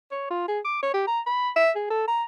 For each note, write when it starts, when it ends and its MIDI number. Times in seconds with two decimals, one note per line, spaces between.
0.11 0.29 73
0.30 0.46 65
0.48 0.60 68
0.65 0.78 86
0.83 0.90 73
0.94 1.04 67
1.07 1.20 82
1.26 1.50 83
1.56 1.71 76
1.75 1.88 68
1.90 2.07 69
2.08 2.23 82